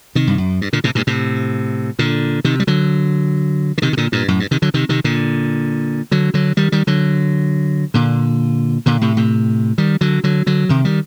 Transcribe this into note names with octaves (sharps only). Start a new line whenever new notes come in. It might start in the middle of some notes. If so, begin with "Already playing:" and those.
C3 D#3
G2
F#2
G2
A#2 D3
A2 C3
G2 A#2
A2 C3
A#2 D3
C3 D#3
G3
D3 F#3
D3
C3 D#3
C3
A#2 D3
G2 A#2
F#2 A2
G2
C3 D#3
D3 F#3
C3 D#3
C3 D#3
A#2 D3
D3 F#3
D3 F#3
D#3 G3
D#3 G3
D3 F#3
A#2 D3
A#2 D3
A2 C3
A2 C3
D#3 G3
D3 F#3
D3 F#3
D3 F#3
C3 D#3
D#3 G3